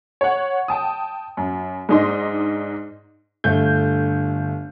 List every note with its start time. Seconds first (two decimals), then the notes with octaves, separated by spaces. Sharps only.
0.21 C#5 F#5
0.68 G5 A5 D#6
1.37 F#2
1.89 G#2 D4 D#4 D#5 C6
3.44 G1 A3 G6